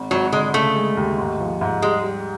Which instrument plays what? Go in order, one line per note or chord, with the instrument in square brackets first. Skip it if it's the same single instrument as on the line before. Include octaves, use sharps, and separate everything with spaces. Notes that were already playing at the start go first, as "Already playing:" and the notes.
Already playing: [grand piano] G#1
[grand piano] G#1 [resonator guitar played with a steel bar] F#3
[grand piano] D3 [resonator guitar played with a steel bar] G#3
[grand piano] C#3 [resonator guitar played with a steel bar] A3
[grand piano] G#3
D#2
G#2
F3
G#2
[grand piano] G3 [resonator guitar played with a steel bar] G#3
[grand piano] G3